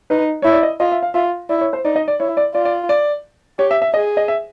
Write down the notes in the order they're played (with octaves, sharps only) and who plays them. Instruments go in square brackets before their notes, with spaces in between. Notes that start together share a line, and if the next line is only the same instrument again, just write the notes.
[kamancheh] D#4 [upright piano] B4
[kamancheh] E4 [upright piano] C#5
[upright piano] D5
D#5
[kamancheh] F4 [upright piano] D#5
[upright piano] E5
F5
[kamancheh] F4 [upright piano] E5
[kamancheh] E4 [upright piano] D5
[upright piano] C#5
C5
[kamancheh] D#4 [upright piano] D5
[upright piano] D#5
D5
[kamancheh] E4 [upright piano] C#5
[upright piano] D5
[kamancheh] F4 [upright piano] D5
[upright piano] D5
D5
[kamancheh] G4 [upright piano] C#5
[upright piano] E5
E5
[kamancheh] G#4 [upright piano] D#5
[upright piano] D#5
E5